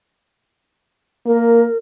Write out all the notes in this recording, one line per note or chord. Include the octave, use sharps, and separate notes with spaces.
A#3 A#4